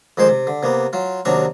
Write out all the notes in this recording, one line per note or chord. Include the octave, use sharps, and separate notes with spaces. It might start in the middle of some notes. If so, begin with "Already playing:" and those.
F2 D#3 G#3 C5 D6
C3
D3
C3 A#3 B3
F#3 F4
D#2 C3 F#3 D4 A#5 C#6